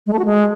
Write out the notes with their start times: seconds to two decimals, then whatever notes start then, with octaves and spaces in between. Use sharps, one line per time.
0.07 G#3
0.13 A3
0.19 F#4
0.25 G#3